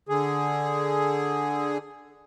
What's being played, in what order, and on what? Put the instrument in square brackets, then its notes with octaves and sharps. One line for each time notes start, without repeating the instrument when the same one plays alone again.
[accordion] D3 G#4